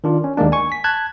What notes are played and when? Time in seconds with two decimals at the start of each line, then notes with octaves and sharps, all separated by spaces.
0.04 D#3 D4 F4
0.24 C#4
0.37 D#2 D#3 G#3 A#3 D4
0.52 G#5 C#6
0.72 B6
0.84 A5 F#6 G#6